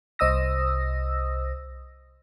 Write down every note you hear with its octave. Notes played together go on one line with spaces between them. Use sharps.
C2 C5 D#5 D#6 E6 A#6